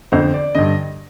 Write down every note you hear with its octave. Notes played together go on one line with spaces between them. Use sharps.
F2 D3 C5
D5
G2 D3 D#5